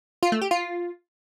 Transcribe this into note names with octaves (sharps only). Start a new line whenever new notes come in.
F4
A3
G4
F4